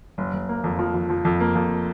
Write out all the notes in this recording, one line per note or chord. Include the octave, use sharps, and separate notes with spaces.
F#1
F#1
A#3
F2
F3
F3
F3
F2
A#3
F2